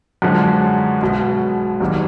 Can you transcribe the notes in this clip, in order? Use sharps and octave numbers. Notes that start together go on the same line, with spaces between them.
F#2 D3 F3 G#3
B1 B2 G#3
F#1 F#2 D#3 G3 A#3